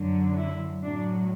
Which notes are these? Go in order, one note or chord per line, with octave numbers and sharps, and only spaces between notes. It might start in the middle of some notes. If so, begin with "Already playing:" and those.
Already playing: F#2 D3 F#3
E4
A2 F#3 D4